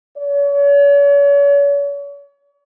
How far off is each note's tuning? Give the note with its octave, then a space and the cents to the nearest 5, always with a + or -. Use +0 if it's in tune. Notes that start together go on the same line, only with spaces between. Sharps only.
C#5 +40